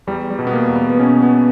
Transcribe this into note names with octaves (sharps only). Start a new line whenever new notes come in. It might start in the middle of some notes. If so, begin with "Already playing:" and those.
E2 G3
G3
B2
B3
A#3
E2
B3
B3
B2 C#4
B3